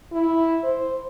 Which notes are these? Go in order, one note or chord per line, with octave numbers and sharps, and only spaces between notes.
E4
C5